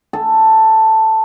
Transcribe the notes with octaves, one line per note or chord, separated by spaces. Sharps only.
A4